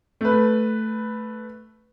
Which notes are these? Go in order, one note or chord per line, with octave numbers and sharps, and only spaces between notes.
A3 B4